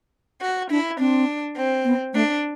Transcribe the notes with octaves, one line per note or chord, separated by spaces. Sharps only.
F#4
D4 E4
C4 D4
C4
B3
A3 D4